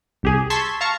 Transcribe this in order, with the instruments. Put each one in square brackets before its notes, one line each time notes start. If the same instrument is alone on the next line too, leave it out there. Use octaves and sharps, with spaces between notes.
[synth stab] C2 G4 G#4
A5 C6 C#6 E6 G#6 B6
F5 A5 A#5 C#6